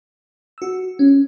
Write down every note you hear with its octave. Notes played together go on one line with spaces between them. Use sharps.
F#4 E6
C#4